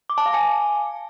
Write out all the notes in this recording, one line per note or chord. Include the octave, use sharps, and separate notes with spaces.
D6
A5
F5
G#5